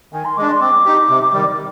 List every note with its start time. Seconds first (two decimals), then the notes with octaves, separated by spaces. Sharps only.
0.13 D#3 G#5
0.25 C6
0.37 G#3 D4 D6
0.49 C6
0.61 C4 D6
0.85 D#4 G4
1.09 C3
1.33 D#3 G3